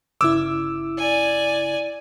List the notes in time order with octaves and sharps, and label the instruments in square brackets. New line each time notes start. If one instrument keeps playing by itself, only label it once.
[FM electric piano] G1 C#3 E4 [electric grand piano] D6 E6
[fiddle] D5 G#5